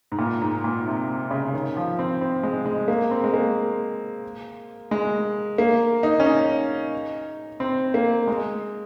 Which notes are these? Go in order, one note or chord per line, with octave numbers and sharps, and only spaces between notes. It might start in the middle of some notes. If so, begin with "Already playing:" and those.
G#2
A#2
G#2
A#2
C3
C#3
D#3
F3
C4
C4
G#3
G#3
A#3
C4
G#3
A#3
G#3
A#3
D#4
C#4
D#4
C4
A#3
G#3